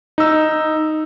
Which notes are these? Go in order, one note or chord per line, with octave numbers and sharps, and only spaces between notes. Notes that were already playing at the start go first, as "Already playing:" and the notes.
D#4 E6